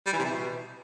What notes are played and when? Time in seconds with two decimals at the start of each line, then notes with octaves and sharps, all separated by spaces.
0.07 G3
0.13 E3
0.19 C3
0.25 E4
0.31 B2